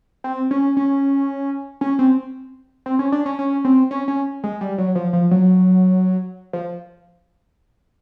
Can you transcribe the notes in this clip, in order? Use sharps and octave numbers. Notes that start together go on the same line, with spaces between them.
C4
C#4
C#4
C#4
C4
C4
C#4
D4
C#4
C#4
C4
C#4
C#4
G#3
G3
F#3
F3
F3
F#3
F3